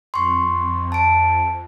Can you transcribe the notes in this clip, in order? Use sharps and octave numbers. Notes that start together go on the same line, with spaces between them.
F2 C6 C#6
A5 D7